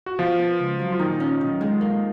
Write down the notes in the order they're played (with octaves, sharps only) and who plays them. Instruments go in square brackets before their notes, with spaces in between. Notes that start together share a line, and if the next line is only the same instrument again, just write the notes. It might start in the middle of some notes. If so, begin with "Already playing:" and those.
[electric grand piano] F#4
[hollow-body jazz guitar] B2 [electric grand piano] F3 F4
[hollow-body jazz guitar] B3
C#2
F#3
[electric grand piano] F4
[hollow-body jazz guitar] A#2 [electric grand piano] D#3 D#4
[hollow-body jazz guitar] C#4
B1
G#3
A#3